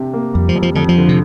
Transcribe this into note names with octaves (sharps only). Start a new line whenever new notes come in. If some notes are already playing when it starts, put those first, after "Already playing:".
Already playing: C3 D4 G4
A#3
F2 G3
F3
F2
F3
F2 D3
F3
D3
C3